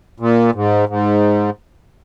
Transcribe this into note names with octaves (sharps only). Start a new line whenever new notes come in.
A#2
G#2
G#2